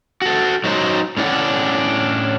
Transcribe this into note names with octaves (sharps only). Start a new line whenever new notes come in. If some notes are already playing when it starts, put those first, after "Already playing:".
F#4 A4
F#3 D#4 C5
A2 C#4 D4 D5 F#5